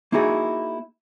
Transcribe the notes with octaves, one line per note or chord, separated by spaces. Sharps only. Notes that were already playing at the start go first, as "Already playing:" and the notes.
A#3 D#4 E4 F#4 G#4